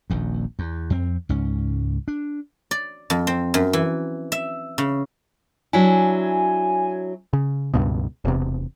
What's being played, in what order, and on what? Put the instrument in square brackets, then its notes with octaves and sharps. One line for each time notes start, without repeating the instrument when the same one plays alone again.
[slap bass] D#1 A#1 D#2
E2
F2 C4
C#2 G#2 C#4
D4
[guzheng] D5
F2
C4
F#2
E3
E5
C#3
[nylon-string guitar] F#3 D4 E4 [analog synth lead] G#5
[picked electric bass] C#3
C#2 G2 B2
E1 E2 C3